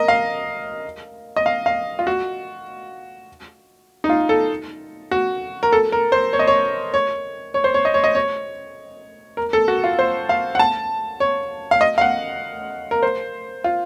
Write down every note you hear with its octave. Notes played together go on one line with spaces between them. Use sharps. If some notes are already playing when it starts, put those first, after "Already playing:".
Already playing: A#4 D#5
F5
D#5
F5
F5
F4
F#4
D#4
F4
A4
F#4
A#4
A4
A#4
C5
C#5
D#5
C#5
C#5
C#5
C5
C#5
D#5
C#5
D#5
C#5
A#4
A4
F#4
F4
C5
F5
F#5
A5
C#5
F5
D#5
F5
F#5
A#4
C5
F4